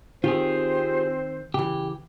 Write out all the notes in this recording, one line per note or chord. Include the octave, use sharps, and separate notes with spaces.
D#3 C4 F4 G4 G#4 C5
C#3 E3 G4